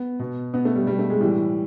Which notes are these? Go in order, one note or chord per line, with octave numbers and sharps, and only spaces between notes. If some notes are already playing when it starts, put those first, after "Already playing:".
Already playing: B3
B2
B2 B3
A3
G3
B2 G3
A3
G#3
A2 E3 G3